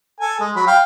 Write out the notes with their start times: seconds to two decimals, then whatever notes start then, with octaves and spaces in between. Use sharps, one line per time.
0.20 A4 G#5
0.40 G#3
0.56 F#3 B5
0.67 F5 G5